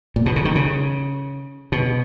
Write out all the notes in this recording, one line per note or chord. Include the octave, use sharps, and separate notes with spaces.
A#2
B2
C#3
D#3
C#3
B2